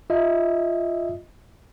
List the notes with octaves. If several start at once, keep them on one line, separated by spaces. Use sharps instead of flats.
F4 D#5 E5